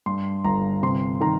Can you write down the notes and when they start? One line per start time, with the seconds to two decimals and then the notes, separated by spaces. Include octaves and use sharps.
0.06 G2 C6
0.44 G1 A#5
0.83 C3 C6
1.21 D#3 A#5